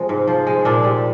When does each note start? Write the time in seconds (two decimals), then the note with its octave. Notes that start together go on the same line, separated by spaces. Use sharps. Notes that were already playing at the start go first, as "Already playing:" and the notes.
Already playing: C3 F3 G#3
0.09 G#2
0.28 F3
0.47 G#3
0.65 A#2 D4
0.85 G3